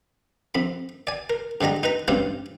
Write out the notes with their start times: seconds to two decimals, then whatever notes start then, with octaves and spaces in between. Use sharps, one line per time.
0.55 F2 B5
1.07 D5 G#5
1.30 A#4
1.61 G#2 D3 G3 D#5 A#5
1.83 D#4 B4 A#5
2.08 A1 G2 G3 C4 C#4 F4